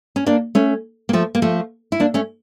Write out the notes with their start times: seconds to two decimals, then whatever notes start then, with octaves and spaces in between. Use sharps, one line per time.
0.16 C#4
0.26 A#3 D4
0.55 A3 C#4
1.09 A#3
1.13 F3 A3
1.35 A#3
1.42 F3 A3
1.92 E4
2.00 A#3 D4
2.14 A3 C#4